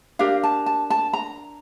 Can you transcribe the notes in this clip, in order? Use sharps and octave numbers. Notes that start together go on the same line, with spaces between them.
D4 G4 A#4 F5
A5
A5
A5
A#5